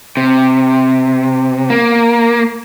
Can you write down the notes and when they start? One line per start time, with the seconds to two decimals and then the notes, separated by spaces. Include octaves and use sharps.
0.17 C3
1.70 A#3